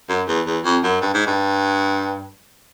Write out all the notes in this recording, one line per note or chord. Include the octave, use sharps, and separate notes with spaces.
F#2
E2
E2
F2
F#2
G2
G#2
G2